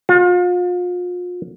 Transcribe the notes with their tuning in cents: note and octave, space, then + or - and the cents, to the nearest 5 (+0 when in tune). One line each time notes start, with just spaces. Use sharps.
F4 +35